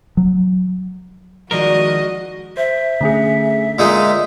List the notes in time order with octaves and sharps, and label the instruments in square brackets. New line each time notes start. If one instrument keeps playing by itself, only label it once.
[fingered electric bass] F#3
[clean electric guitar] D#3 F3 A#4 [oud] G#3 D5 [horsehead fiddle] F#4 [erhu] D#5
[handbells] C5 [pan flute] E5
[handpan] D3 [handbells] A3 C#4 G#4
[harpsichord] A#2 G#3 D#4 [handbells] E6